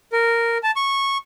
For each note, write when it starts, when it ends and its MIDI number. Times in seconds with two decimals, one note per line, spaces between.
0.13 0.58 70
0.63 0.71 81
0.76 1.18 85